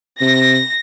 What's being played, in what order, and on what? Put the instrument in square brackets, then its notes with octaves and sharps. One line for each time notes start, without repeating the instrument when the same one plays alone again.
[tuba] C3 [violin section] A#6